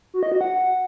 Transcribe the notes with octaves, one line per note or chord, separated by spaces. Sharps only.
F#4
D#5
F#4
F#5